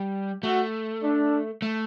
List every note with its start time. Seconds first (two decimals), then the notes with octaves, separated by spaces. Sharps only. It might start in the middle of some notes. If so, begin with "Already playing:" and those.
Already playing: G3
0.43 A3 F#4
1.04 D4
1.62 A3